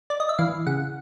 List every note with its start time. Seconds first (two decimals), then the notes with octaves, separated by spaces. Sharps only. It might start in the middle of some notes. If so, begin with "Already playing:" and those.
0.10 D5
0.20 D#5
0.29 E5
0.38 E3 F5
0.67 C#3 F#5